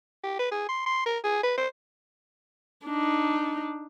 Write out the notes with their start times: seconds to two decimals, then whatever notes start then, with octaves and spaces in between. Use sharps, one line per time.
0.23 G4
0.39 B4
0.51 G#4
0.69 C6
0.86 C6
1.06 A#4
1.24 G#4
1.43 B4
1.58 C5
2.86 D4 D#4